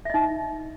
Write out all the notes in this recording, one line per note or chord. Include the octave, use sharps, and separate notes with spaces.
D#4 D#5 E5